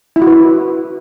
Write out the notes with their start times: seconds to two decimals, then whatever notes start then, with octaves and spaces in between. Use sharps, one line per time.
0.16 E4
0.22 F#4
0.27 B4